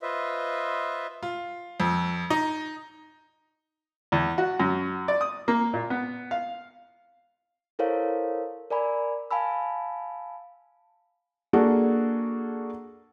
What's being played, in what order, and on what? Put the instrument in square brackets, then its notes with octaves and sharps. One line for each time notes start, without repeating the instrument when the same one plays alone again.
[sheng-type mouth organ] F4 B4 C5 D#5 E5
[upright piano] F4
F2
D#4
[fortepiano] E2
F#4
F#2
D5
D#6
A#3
A#2
B3
F5
[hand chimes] E4 A4 A#4 C5 C#5 F5
A#4 D5 G#5 B5
F5 G#5 A5 B5 E6
[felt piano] A#3 D4 F#4 G#4 A4